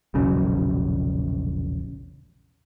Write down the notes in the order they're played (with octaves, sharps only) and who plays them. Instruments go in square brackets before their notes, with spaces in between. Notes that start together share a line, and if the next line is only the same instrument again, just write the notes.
[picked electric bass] E1 A#1 C#3 F#3